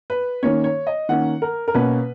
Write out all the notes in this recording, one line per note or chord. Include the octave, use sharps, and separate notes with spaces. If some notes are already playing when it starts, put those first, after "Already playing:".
B4
D#3 A#3 C#4 C#5
C#5
D#5
D#3 A#3 C#4 F#5
A#4
A#4
B2 A#3 C#4 B4